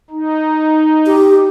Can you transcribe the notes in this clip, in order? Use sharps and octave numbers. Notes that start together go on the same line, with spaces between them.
D#4
G4